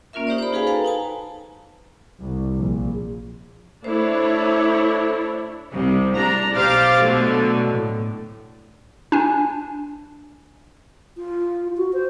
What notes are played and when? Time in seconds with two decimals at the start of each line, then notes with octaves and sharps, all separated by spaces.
0.13 A#3 C#4 F4 A#4 E5
0.27 D#4 G4 C5 D5
0.38 C5 B5
0.52 D#4 F#4 G#4 B4 F5 G#5
0.67 A4 B4 F5 G5 A5 A#5
0.85 D#4 G#5 A5
2.21 C2
2.56 A#1
3.84 A3 D4 E4 C5 C#5
5.73 C2 C3
6.16 D4 A#5
6.53 B1 G4 C5 F5 D6 A6
7.01 B2 D3 F#3 A3
7.69 A2
9.12 D4 G#5
11.16 F4
11.77 F#4
11.93 C5